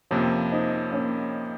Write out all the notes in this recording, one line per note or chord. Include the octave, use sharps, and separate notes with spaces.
F2 C3 F3 A#3 C#4
C4 D#4
A#3 C#4